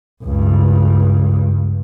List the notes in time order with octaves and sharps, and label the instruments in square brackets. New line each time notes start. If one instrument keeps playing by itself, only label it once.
[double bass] C#2 G2